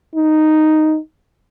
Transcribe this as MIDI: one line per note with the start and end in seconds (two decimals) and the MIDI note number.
0.15 0.97 63